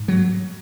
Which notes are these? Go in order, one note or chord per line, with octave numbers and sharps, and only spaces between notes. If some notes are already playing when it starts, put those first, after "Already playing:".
Already playing: G#2
F#3